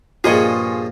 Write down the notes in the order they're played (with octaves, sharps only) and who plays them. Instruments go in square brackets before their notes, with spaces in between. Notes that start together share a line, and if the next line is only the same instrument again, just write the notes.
[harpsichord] G2 A#2 F3 [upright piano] F4 [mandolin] G#4 D#5 C#6